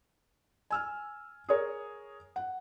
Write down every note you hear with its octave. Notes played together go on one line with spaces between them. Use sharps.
G#5 E6 F6
G#4 A#4 C#5
F#5